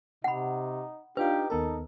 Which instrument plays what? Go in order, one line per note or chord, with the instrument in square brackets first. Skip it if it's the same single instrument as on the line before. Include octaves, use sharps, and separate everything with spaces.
[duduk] C3 [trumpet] D#4 [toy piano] F#5 B5
[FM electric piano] D4 F4 F5 [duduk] D#4 [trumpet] G4 [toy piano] B4
[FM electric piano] D#2 B3 A#4 [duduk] D#4 [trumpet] A4